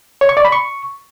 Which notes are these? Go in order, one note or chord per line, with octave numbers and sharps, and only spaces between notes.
C#5
C#6
D5
B5
C#6